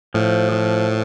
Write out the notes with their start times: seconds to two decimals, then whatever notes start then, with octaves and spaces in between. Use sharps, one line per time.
0.14 A2 F3
0.52 F3